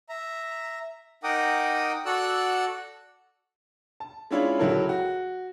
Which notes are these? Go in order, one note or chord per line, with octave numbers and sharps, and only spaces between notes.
E5 A#5
D#4 A#4 F#5 G5 D6 D#6
F#4 A4 D5 F#5 E6 F#6
A5
G#3 C#4 D4 E4 F4 C#5
C#2 F#3 E4 A4 A#4
F#4